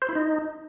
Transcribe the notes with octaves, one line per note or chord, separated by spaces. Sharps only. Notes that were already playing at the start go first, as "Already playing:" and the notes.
C5
E4
D#4